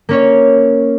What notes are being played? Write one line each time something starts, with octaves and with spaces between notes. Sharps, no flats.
A#3 C#4 C#5